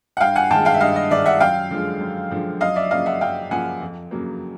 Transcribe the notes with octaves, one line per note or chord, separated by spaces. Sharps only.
F#5
G2 F5 G5
F#5 G#5
D#3 G#3 G5 A5
F5 G5
E5
G2 D#5 F5
D#5
D#3 G#3 D5 E5
E5 F#5
F#2 F5 G5
D3 F3 G#3
F#2
D3 F3 G#3
F#2 D#5 F5
D5 E5
C#3 F3 A#3 D#5 F5
E5 F#5
F#2 F5 G5
C#3 F3 A#3 F#5 G#5
F2
C#3 F#3 A#3